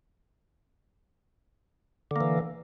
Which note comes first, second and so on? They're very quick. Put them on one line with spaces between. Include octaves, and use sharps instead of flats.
D3 A#3 E3